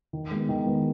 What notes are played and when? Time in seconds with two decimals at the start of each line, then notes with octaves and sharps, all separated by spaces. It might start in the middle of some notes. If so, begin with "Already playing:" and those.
0.13 D#3
0.31 G#3 B3
0.49 D#3
0.67 G#3 B3